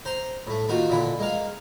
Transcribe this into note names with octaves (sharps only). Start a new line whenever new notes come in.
C5 A#5 C6
A2 A3
D#3 A#3 F4 F#4
A#2 D3 E3 E4
G#3 A#3 F5